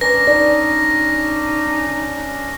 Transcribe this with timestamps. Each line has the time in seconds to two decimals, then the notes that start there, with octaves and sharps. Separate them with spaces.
0.01 C#4 D4 B4 A#5 A#6
0.27 D#4 D5